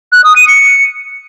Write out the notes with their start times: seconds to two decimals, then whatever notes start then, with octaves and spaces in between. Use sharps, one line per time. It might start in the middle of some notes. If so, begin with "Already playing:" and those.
0.12 F#6
0.24 D#6
0.36 D#7
0.48 C#7